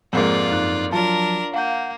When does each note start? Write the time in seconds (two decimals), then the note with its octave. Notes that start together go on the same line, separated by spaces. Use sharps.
0.13 F2 G#2 A#3 F4 D5
0.51 F#2 D#4 F#6
0.92 F3 F#3 D4 F4 A#4 A5
1.54 A#3 F5 F#5 G6